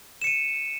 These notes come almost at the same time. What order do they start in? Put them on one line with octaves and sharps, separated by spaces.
E7 C#7 D#7